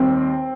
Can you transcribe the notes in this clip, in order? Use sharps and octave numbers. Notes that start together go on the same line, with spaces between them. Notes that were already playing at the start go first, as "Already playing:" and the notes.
Already playing: D#2 D#3 G3 C4